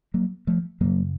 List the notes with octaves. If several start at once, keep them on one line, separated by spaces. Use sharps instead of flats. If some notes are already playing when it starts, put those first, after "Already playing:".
F#3 A#3
F3 A3
F#2 C#3 F#3 A#3